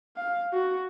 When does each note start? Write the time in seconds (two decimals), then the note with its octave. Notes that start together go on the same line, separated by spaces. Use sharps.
0.16 F5
0.53 F#4